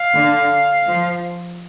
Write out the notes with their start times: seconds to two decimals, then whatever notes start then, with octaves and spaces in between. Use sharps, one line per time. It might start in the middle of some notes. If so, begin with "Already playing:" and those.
Already playing: F5
0.15 D3
0.87 F3